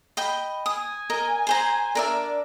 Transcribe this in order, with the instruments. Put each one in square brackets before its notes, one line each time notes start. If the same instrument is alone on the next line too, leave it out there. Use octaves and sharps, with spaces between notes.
[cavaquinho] D#5 G5 B5
[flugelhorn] G#5 [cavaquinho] D#6
[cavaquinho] A#4 D#5
G#4 C5 A#5
[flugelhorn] D4 [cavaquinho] A#4 D5 E5